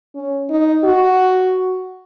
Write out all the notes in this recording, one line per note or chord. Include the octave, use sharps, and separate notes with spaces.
C#4
D#4
F#4